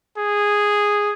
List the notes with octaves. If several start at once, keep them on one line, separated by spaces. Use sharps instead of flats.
G#4